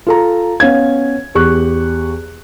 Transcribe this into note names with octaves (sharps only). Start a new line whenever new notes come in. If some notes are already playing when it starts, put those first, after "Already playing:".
F4 A4 A#5
B3 C#4 F5 G#6
E2 G4 C#6 F#6